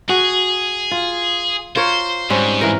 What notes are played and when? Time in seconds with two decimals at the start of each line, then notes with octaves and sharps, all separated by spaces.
0.09 F#4 G#4
0.91 F4
1.76 F4 A#4 C5 C#5
2.30 G#2 G3 C4 C#4
2.61 E3 A#4